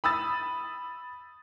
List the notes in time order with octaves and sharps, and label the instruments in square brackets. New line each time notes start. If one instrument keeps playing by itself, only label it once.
[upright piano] B5 D#6 E6 A6